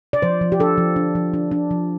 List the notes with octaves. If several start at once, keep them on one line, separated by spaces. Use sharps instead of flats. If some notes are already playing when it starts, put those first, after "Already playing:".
D5
F3 C5
F3
G4
D4 A4
F3
D4
F3
D4
D4
F3